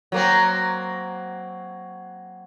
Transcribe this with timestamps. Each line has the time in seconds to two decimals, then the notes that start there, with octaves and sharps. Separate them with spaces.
0.12 F#3 A#3 C4